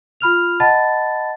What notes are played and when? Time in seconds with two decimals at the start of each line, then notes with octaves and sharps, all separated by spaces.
0.20 F4 B5 F6 F7
0.60 D#5 F#5 A5 B5 A6